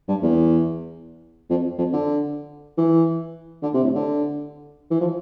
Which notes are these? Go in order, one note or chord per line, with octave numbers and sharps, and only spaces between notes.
G2
E2
F2
F2
D3
E3
D3
C3
A2
D3
E3
F3